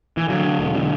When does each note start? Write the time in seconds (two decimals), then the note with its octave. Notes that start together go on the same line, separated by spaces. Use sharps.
0.17 E3
0.29 D3 F#3
0.44 D3
0.59 E1
0.75 D3